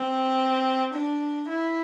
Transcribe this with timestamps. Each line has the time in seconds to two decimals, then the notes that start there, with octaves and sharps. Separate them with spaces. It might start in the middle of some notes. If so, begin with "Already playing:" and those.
Already playing: C4
0.94 D4
1.49 E4